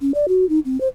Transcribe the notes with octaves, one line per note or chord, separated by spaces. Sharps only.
C#4
D5
F#4
D#4
C4
C5